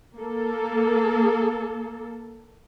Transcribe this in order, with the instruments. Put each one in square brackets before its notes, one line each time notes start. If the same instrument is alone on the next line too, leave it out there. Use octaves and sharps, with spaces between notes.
[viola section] A#3 A4